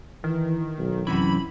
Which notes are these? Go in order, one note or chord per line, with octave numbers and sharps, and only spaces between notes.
D#3 E3
B1
F#2 C3 E3 C#4 B5